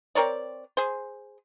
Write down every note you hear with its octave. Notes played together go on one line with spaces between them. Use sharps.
C4 A#4 C#5 D5
G#4 C5